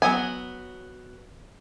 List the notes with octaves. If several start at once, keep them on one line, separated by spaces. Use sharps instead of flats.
F#3 B3 G#5